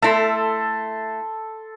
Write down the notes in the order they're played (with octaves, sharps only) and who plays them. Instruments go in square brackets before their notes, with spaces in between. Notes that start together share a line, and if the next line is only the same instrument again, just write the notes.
[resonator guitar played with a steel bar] A3 E4 [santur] A4 C6